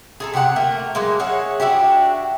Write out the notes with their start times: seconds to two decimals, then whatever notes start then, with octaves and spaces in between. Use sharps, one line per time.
0.20 G#4 A4 A#5
0.34 C3 G4 G#4 F#5
0.56 A3 A#3 A#4
0.95 F#3 G#3 A#3
1.20 G#4 C#5 E5 F#5
1.60 D4 E4 F#4 G4